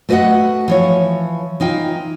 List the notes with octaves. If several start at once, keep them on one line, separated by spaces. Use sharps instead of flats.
A3 F#4 B4 C#5 D#5 F#5
E3 F3 C#5
E3 D#4 F4 G5